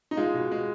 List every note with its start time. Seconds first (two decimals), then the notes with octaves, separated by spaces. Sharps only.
0.11 D#4
0.17 G#3 F4
0.34 B2
0.51 G#3